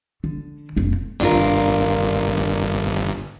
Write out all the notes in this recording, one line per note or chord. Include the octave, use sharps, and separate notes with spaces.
D3
F1 A#2
G1 D4 F4 A#4